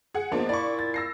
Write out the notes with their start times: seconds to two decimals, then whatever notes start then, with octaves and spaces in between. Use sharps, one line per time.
0.15 G#4 F#5
0.32 G#2 F3 A#3 B3 D4
0.49 A#2 E4 D5 C#6
0.79 A6
0.94 E6 A#6 C7